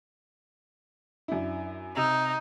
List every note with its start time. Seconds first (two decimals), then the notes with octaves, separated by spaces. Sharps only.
1.28 F#2 D4 E4
1.97 C3 D#4 E6 F7